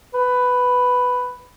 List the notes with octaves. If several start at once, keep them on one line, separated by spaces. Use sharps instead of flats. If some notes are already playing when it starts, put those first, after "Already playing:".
B4